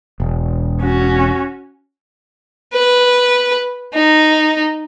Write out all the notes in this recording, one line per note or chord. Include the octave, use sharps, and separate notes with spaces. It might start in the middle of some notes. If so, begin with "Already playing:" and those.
E1
C#4 F#4
B4
D#4